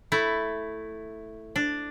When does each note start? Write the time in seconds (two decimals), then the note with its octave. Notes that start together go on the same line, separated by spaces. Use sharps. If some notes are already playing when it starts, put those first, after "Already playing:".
0.12 A3 E4
1.56 D4